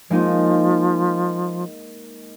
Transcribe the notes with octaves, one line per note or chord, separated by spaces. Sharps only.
F3 G#3 A#3 D#4